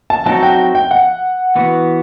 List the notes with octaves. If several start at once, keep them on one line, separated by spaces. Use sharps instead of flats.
A5
F#3 C4 D#4 F#4 A5
G5
G5
F#5
E3 B3 F#4 B4